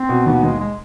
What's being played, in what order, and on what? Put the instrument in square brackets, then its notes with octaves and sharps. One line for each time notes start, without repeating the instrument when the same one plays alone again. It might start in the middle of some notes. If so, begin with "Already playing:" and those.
Already playing: [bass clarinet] C4
[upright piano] B2
[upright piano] D#2 [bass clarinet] B3
[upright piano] D#2 [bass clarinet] G#3
[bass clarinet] G#3